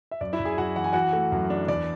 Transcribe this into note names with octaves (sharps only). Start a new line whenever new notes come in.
E5
F#2 D5
E4 E5
F#2
G#4 G#5
F#2 F#4 F#5
E3 F#5
G#5
E3 F#4 F#5
A3
F#2
D4
E2 D5